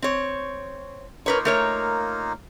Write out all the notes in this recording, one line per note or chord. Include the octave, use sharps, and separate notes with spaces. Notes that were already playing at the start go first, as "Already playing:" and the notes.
C4 C#5
A#3 D#4 F4 A#4 B4 C#5
A3 A#4 C#5